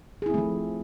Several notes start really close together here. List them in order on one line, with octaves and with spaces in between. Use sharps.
G#4 E4 C4 A3 F3